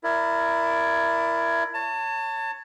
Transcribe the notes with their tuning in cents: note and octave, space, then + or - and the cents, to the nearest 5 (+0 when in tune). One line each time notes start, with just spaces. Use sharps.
E4 +20 A#4 +0 D5 +0
C#5 +0 A5 +30